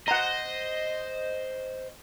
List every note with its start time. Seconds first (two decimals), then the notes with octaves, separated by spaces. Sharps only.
0.08 C5 D#5 F#5 A#5